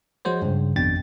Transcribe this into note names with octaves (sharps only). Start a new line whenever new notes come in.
F3 G#3 F#4 C5 C#5
G2 C#3
G#1 F2 B2 D4 G5 A6